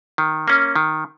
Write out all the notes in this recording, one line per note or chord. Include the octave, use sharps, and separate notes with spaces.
D#3
A#3 C#4
D#3